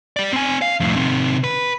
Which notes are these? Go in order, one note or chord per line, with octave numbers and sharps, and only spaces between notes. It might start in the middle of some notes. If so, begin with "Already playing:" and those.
G4 D5
C4 G#5
F5
F2 A2
C3 D#3
B4